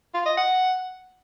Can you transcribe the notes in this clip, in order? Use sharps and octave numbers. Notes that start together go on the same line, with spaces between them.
F4
D#5
F#5